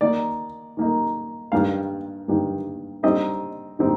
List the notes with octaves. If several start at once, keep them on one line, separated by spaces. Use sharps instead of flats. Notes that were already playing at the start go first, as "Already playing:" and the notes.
D#3 A#3 D#4 D5
D#3 A#3 D#4
G2 D#3 G3 F5
G2 D#3 G3
D3 G3 C4 D#4 D#5
D3 G3 C4 D#4